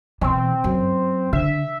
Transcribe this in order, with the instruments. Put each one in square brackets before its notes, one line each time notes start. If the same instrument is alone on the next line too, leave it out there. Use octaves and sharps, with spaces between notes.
[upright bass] B2 E3 [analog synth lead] C4
[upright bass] F#2
[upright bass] D3 [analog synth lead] E5